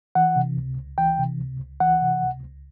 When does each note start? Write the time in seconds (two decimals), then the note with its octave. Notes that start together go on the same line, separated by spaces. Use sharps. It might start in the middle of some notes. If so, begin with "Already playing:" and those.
0.15 E3 F#5
0.36 C3
0.57 C#2
0.77 C#2
0.98 E3 G5
1.19 C3
1.39 C#2
1.60 C#2
1.80 E3 F#5
2.02 C3
2.22 C#2
2.43 C#2